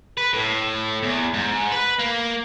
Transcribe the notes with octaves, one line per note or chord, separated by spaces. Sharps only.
B4
A2
E2
G#2
B4
A#3